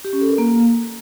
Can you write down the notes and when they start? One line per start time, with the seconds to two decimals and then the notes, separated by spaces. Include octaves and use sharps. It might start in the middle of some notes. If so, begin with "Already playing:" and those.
0.05 G4
0.13 C#4
0.21 A4
0.30 A#4
0.38 A#3